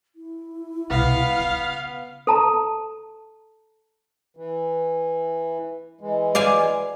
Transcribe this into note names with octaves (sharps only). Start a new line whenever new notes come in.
E4
C2 B2 B3 F5
C#3
A4 A5 A#5
E3
E3 G#3
D5 F5 G#5